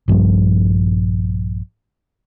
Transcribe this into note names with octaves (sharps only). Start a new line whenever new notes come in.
A#1 G2 F3 G3